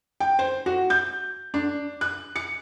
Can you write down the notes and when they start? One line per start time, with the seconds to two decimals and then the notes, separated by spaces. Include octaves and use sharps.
0.20 G5
0.39 C5
0.66 F#4
0.90 G6
1.54 D4
2.01 F#6
2.36 C#7